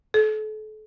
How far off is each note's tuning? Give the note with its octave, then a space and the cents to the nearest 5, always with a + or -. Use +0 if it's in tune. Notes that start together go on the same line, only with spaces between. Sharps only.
A4 -35